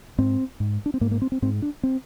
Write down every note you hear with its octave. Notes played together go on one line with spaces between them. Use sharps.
G#2 C4
G#2
D4
C4
G#2 A#3
A#3
C4
C4
G#2 C4
D4
C4